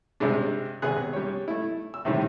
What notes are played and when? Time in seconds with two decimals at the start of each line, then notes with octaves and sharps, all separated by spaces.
0.20 G2 C3 G3 G#3 D4
0.82 G#1 C3 B3 G#4 F#6
1.13 G3 C#5
1.48 A3 E4
1.94 E6
2.05 A2 C3 D#3 E3 G3